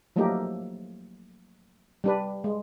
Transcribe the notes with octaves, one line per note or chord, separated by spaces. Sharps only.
F3 F#3 A3 A#3 D#4 G4
G3 D4 B4
G#3